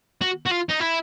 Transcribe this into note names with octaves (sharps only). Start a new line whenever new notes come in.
F#4
F#4
F4
D#4
E4